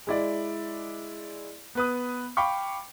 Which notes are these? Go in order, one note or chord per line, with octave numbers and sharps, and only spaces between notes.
G#3 E4 D5
B3 B4 D#6
F5 G5 B5 C#6 D6